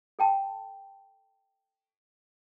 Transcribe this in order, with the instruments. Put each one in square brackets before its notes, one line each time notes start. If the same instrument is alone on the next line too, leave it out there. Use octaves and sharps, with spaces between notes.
[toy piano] A4 G5 A5